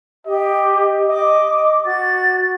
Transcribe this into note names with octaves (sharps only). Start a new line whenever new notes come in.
G4 D#5
D#5 D6
F#4 A6